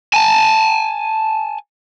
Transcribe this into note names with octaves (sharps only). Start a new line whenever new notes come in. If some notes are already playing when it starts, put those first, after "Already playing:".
G#5 A5